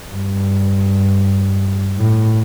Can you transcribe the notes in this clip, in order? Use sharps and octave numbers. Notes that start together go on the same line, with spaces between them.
G2
A2